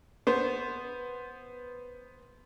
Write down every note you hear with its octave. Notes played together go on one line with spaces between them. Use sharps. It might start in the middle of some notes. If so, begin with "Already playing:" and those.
B3 C5